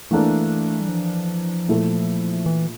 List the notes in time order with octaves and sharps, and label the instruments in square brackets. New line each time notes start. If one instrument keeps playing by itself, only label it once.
[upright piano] E3 A#3 D4 A4 [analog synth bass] A3
[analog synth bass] G3
F3
[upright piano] A#2 A3 E4 A4
[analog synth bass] E3